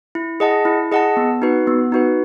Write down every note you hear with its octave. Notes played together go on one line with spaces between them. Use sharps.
E4
G#4 D#5 F#5 A5
E4
G#4 D#5 F#5 A5
B3
D#4 F#4 B4
B3
D#4 F#4 B4